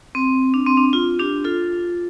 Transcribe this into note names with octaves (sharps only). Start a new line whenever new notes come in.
C4
D4
C4
D4
F4
D4 G4
F4 A4